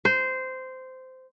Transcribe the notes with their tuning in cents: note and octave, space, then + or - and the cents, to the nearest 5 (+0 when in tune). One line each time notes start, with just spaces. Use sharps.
C5 -15